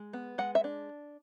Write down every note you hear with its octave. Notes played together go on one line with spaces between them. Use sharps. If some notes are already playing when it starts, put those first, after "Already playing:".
Already playing: G#3
B3
G#3 F#5
E5
D4